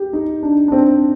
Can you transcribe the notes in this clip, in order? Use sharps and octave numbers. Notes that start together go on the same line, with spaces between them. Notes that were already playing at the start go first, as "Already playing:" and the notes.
Already playing: G4
D#4
D4
D4
C4